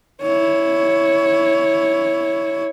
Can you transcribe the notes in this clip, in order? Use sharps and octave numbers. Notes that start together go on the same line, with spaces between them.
E4 C#5